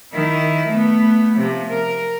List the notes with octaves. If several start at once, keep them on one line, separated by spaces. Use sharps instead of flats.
D#3 E4
A3 B3
C3 F3
A#4